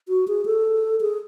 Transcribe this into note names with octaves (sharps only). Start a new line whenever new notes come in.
F#4
G#4
A4
G#4